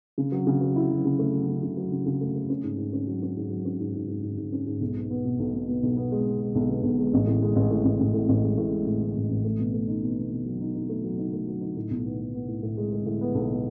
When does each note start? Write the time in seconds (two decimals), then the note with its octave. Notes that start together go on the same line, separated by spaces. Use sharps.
0.18 C#3
0.32 F#3
0.47 C#3
0.61 F#3
0.76 E4
0.91 F#3
1.05 C#3
1.19 A3
1.33 F#3
1.49 C#3
1.63 C#3
1.77 F#3
1.92 C#3
2.06 C#3
2.21 A3
2.36 A3
2.50 C#4
2.64 G#2
2.78 G#2
2.93 C#4
3.07 F#3
3.22 C#4
3.37 G#2
3.50 F#3
3.65 C#4
3.80 G#2
3.94 G#2
4.09 G#2
4.23 G#2
4.38 G#2
4.52 C#4
4.67 G#2
4.81 B1
4.95 B2
5.10 B3
5.25 B2
5.39 B1
5.53 B2
5.68 B2
5.83 B1
5.97 B3
6.12 G#3
6.26 B3
6.41 G#3
6.55 B1
6.69 B2
6.83 B1
6.98 G#3
7.13 A1
7.27 A2
7.42 G#3
7.56 A1
7.70 A2
7.85 A1
8.00 A1
8.14 A2
8.29 A1
8.43 G#3
8.57 A2
8.71 G#3
8.86 A2
9.01 A2
9.15 A1
9.30 A1
9.44 A3
9.59 B2
9.74 A3
9.88 D#4
10.02 B2
10.17 B2
10.31 B2
10.46 F#3
10.61 D#4
10.75 D#4
10.89 A3
11.04 F#3
11.18 D#4
11.33 A3
11.47 F#3
11.61 D#4
11.76 A2
11.91 B1
12.05 B3
12.20 B3
12.34 B3
12.48 A2
12.63 A2
12.77 G#3
12.92 G#3
13.06 A2
13.21 B3
13.35 B1
13.50 B3